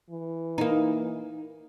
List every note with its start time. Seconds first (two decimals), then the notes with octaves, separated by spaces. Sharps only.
0.11 E3
0.58 A#3 D#4